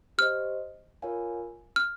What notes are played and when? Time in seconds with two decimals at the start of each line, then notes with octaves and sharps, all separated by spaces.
0.18 G4 C5 D#5 F6
1.02 F4 A#4 C#5 F5 G#5
1.76 F6